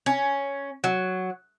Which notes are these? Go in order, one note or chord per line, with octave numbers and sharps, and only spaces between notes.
C#4
F#3